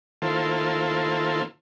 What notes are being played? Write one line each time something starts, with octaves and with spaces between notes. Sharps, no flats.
D#3 A#3 E4 F4 A4 C5